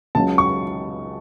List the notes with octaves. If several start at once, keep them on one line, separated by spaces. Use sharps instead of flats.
C#2 C#3 F#3 A5
C#6